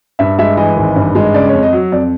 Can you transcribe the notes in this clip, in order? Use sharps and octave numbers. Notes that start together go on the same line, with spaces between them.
G2 E5
G#3 E5
E3 D#5
G#1
G2
G#3
C#3 D5
F2 C#5
D#5
F#3
F2 D5